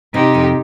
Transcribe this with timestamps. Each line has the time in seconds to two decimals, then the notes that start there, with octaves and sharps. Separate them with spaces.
0.14 C3 D#4 G4
0.34 F2